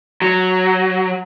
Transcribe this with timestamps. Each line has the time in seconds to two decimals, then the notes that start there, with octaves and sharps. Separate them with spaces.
0.22 F#3